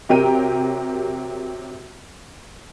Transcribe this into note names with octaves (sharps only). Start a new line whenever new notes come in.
C3 F#3 G4 A#4 G5 D#7